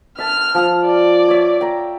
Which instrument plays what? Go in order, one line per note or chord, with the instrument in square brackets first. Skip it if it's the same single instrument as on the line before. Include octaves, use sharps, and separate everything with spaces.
[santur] E5 A5 [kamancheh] F6
[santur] F3 D#6
[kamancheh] D5
[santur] C#5 E5
G5 A#5